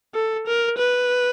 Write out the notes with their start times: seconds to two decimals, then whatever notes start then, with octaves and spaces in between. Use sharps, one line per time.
0.15 A4
0.47 A#4
0.78 B4